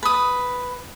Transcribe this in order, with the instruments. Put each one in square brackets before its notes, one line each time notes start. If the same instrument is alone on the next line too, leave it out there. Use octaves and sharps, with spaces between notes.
[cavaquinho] B4 D#6